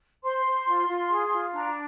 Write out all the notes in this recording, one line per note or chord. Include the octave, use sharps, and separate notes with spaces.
C5 C6
C5
F4
F4
G#4
F4
D4 A#5